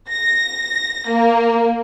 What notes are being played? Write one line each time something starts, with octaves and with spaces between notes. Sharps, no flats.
A#6
A#3